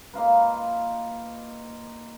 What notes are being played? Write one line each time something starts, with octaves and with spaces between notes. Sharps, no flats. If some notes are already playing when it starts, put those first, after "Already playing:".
A#3 D#4 F4 B4